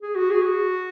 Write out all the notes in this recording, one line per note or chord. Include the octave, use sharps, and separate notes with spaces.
G#4
F#4
G#4
F#4